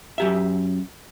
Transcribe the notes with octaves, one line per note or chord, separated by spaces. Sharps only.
F#2 G4 E5